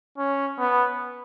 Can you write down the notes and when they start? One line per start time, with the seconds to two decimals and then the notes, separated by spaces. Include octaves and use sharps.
0.18 C#4
0.59 B3